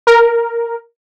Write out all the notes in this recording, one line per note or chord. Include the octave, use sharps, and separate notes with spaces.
A#4